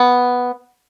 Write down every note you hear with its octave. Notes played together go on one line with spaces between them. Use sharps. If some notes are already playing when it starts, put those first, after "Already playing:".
Already playing: B3